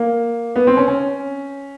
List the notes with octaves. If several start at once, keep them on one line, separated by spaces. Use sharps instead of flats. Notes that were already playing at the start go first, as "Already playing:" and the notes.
Already playing: A#3
B3
C4
C#4
C#4